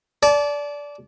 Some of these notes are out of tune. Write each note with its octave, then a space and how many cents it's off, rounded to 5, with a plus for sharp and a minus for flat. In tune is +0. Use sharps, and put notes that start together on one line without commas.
D5 -15 A5 -30